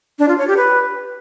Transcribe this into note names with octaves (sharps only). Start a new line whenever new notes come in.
D4
F4
C#5
G4
B4